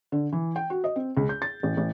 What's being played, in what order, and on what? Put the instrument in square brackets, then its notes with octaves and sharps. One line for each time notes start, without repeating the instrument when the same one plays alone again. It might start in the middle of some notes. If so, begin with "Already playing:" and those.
[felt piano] D3
E3
G5
F#4
D#5
C4
C#2
G6
A6
A1
A1